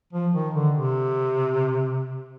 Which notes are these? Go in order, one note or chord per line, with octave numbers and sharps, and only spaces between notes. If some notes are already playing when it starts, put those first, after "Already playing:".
F3
D#3
D3
C3